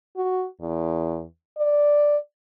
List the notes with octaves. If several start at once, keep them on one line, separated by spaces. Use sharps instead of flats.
F#4
E2
D5